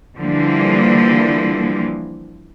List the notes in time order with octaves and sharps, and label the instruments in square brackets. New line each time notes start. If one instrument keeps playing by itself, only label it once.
[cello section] D3 E3 F3 G3 A#3